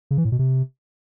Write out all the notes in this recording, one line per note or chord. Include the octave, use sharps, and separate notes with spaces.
C#3
E3
A2
B2
C3